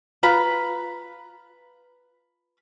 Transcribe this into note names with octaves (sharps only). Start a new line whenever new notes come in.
F4 B4 A#5 B5